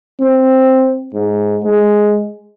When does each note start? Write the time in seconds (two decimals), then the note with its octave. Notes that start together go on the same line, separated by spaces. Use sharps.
0.20 C4
1.14 G#2
1.64 G#3